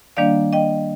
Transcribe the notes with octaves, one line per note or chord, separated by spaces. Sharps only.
D#3 G3 A#3 D4 D5 F5
D#5 G5